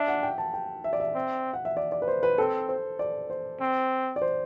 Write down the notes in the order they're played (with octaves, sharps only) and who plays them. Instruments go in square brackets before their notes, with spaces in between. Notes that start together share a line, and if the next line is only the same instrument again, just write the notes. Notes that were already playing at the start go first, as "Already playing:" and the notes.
Already playing: [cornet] D4 [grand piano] E5
[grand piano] F#5
G5
A5
G5
E5
D5
E5
[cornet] C4
[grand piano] F#5
E5
D5
D5
B4
C5
B4
[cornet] C4 [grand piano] A4
[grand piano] C5
D5
C5
[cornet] C4
[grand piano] D5
C5